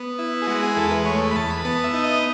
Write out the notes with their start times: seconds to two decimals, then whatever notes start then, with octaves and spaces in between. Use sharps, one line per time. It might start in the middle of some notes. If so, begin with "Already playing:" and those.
Already playing: B3
0.19 E4
0.42 G#4
0.47 G#3 F#4
0.63 G#4
0.76 E2 A4
0.91 B4
1.05 A3 C#5
1.31 B5
1.36 E2 A5
1.50 B5
1.64 B3 A5
1.84 E5
1.94 D#4
2.04 D#5